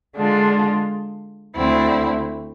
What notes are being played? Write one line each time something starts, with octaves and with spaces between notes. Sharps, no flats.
D3 G#3 D4 F4
D2 D3 A3 C4 E4